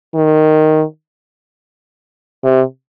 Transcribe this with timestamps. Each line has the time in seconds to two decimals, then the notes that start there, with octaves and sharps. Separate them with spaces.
0.15 D#3
2.44 C3